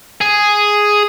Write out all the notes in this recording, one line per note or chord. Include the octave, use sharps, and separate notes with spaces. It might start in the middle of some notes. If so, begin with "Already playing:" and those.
G#4